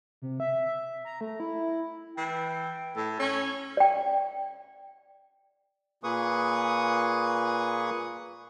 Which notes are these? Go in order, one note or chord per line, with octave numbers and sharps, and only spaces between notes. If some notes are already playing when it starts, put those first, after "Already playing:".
C3
E5
E5
A#5
A3
E4
E3 G5
A2 A4
C#4 C#5
D5 G5
A#2 A#3 G#4 B4 C#6 D#6